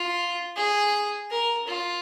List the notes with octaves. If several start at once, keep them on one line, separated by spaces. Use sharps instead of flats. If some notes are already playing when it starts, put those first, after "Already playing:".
Already playing: F4
G#4
A#4
F4